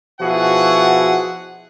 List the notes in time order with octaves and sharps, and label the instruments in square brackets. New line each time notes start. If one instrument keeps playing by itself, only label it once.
[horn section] B2 F3 E4 F#4 G#4 F#5